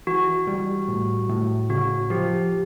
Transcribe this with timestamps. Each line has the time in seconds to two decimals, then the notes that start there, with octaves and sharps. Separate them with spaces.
0.07 E3 F#4
0.47 G3
0.88 A2
1.29 A2
1.70 C#3 F#4
2.10 F3 G4